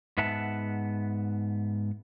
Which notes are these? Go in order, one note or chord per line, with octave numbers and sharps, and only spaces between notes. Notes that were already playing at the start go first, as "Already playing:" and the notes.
G#2 B3 E5 F#5 A5